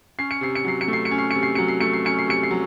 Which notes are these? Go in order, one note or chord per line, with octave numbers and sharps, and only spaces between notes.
C#4 C7
C#7
C3 C7
C#7
F#3 C7
C#7
A3
C7
C#7
C#4
C7
C3 C#7
C7
F#3 C#7
C7
A3 C#7
C7
C#4 C#7
C7
C3 C#7
C7
F#3